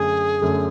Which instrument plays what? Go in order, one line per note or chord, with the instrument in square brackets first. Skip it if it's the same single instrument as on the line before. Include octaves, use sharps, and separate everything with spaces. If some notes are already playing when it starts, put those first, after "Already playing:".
Already playing: [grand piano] F#2 D3 A3 [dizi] G#4
[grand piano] F#2 D3 A3